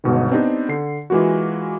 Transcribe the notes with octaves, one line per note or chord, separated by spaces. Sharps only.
G1 G#2 B2 D#3
B3 C4 D4 D#4 G4 C5
D3 C7
E3 G#3 A#3 F4 F#4